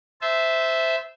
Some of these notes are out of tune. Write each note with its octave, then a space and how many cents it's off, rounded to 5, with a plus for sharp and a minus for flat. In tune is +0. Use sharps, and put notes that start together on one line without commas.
C5 -15 E5 -5 A5 -25